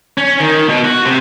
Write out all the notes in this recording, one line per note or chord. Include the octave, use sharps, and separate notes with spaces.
C#4
D#3
B2
F#4
C3